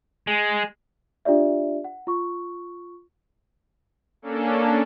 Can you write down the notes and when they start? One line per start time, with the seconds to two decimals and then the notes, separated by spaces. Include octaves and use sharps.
0.27 G#3
1.25 D4 F4 G4 D5 E5
1.84 F#5
2.07 F4 C#6
4.22 A#3 C#4 D4 A4